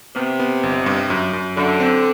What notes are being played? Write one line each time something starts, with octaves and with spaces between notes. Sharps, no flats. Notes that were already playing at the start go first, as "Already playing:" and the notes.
C3 B3
B3
G1
G2
F#2
F#2
F#2 D3
C4